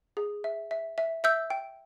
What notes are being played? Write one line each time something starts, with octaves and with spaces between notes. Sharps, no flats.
G#4
E5
E5
E5
E5 E6 G6
G5